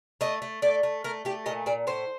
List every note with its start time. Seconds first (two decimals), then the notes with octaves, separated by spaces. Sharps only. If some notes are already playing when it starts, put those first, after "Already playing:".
0.21 A3 D#5
0.42 A3
0.62 A3 D5
0.83 A3
1.04 A3 A#4
1.25 A3 G4
1.46 A#2 D#5
1.66 A#2 D5
1.87 A2 C5